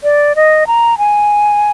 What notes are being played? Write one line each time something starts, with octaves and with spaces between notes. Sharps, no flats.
D5
D#5
A#5
G#5